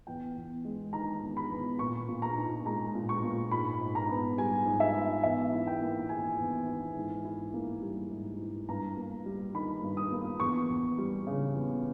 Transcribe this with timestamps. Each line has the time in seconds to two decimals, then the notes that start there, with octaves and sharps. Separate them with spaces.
0.07 E2 G5
0.36 E2
0.65 G#3
0.93 D#3 A#5
1.22 E2
1.37 B5
1.51 E2
1.79 A#2 C#6
2.09 A#2
2.22 A#5
2.37 D#4
2.66 G#3 A#5
2.95 A#2
3.09 C#6
3.24 A#2
3.51 G#2 B5
3.81 G#2
3.95 A#5
4.09 B3
4.38 G3 G#5
4.66 G#2
4.80 E5
4.95 G#2
5.23 E2 E5
5.52 E4
5.67 G5
5.82 A#3
6.09 D#3 G#5
6.39 E2
6.68 E4
6.97 G#2
7.25 E4
7.54 A#3
7.82 G3
8.11 G#2
8.39 E4
8.69 G2 A#5
8.97 A#3
9.26 G3
9.54 D#3 B5
9.83 G2
9.97 D#6
10.12 A#3
10.40 E2 C#6
10.69 E2
10.98 G3
11.27 C#3
11.55 E2